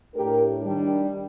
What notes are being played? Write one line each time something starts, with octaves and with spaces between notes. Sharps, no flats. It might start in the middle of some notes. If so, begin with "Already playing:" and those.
A2 A3 D4 G4 A#4
D#3 G3 D4